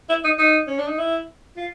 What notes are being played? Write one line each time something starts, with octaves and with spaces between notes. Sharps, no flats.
E4
D#4
D#4
C#4
D4
D#4
E4
F4